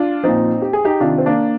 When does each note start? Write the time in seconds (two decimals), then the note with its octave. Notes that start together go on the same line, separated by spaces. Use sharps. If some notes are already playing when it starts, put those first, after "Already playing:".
Already playing: D4 F4
0.23 A#2 F3 C4 D#4
0.62 G4
0.73 G#4
0.85 D#4 G4
1.00 C3 D#3 D4 F4
1.18 C4
1.26 A#3 D4